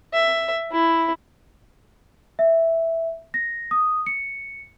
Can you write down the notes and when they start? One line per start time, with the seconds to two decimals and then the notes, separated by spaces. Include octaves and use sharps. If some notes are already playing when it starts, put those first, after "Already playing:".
0.13 E5
0.72 E4
2.39 E5
3.34 A#6
3.71 D#6
4.06 C#7